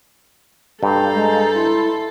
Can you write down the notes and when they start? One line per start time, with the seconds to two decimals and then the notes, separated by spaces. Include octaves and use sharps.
0.83 G2 A4 F5 A#5 G6
1.14 G#3
1.55 E4 C6